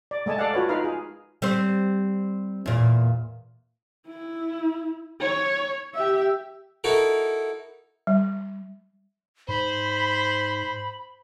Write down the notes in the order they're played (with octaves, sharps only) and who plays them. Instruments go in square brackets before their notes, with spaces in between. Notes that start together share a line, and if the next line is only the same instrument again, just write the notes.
[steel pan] D5
G#3 A3 D#5 G#5 A5
A4 D5 F5 F#5
F4 F#4 B4 C#5
D#4 F4 A#4 B4 F5
G#4
[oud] G3 C4 C5
E2 A#2
[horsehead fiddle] E4
C#5
G4 E5
[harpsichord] D#4 E4 F#4 A4 A#4
[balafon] G3
[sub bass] G#2 [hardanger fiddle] C5 [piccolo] B5